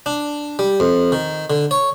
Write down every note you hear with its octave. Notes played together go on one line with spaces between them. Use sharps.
D4
G3
F2
D#3
D3
C#5